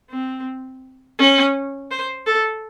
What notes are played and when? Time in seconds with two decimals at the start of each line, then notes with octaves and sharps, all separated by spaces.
0.10 C4
1.19 C#4
1.91 C5
2.27 A4